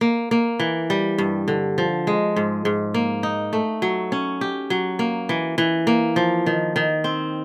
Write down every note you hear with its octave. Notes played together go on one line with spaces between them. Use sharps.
A#3
A#3
E3
G3
G2
D3
F3
G#3
G#2
G#2
A#3
D#4
A3
F#3
C#4
G4
F#3
A#3
E3
E3
A#3
F3
D#3
D#3
C4